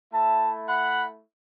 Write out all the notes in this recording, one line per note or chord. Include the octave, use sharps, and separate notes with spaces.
A3 E4 E5 A5
F#5 B5